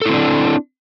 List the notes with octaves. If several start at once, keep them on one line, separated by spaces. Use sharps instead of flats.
C4 D4 E4 A4